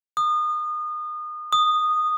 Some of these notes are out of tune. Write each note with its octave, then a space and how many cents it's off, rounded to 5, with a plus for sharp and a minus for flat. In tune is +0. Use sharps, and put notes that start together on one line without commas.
D#6 -30
D#6 -10